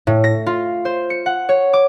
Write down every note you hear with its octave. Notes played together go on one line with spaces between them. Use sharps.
A2
A#6
F4
C5
C#7
F#5
C#5
D6